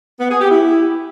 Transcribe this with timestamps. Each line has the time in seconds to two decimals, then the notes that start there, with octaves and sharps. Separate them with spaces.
0.20 B3
0.31 G#4
0.41 G4
0.51 E4